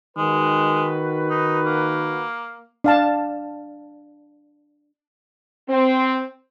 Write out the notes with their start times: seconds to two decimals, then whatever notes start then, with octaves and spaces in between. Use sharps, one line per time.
0.17 D#3 G#3 F#4 B4
1.30 D#4
1.66 A#3
2.84 D4 F5 A5
5.69 C4